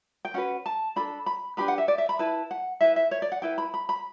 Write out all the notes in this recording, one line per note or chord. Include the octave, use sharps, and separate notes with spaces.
G5
C#4 F#4 B4 F#5
A5
D4 A4 B5
B5
D4 G4 B4 B5
F#5
E5
D5
E5
B5
E4 B4 A5
F#5
E4 B4 E5
E5
C#5
D5
F#5
E4 B4 G5
B5
B5
B5